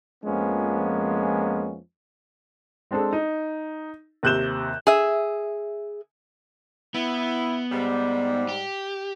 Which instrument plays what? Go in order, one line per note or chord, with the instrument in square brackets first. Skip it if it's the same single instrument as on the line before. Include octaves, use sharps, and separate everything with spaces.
[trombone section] F2 F3 G#3 A#3 B3 C#4
[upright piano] G#3 C4 D4 G#4 A4
D#4
D#2 C3 F#6 G6 E7 G7
[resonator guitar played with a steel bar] G#4 E5
[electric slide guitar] B3 [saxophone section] E4
[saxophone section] G#2 G3
[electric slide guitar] G4